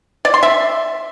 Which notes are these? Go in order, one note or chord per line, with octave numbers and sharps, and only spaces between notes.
D5
C6
E5